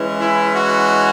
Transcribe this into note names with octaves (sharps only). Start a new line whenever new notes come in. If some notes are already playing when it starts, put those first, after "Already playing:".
Already playing: E3 G#3 C#4
E4
F#4